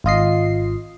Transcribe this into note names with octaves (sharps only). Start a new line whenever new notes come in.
G#1 F4 D#5 C7